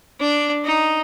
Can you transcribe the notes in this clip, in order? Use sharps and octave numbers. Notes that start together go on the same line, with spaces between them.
D4
D#4